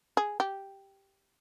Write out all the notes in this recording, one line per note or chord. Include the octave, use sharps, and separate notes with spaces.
G#4
G4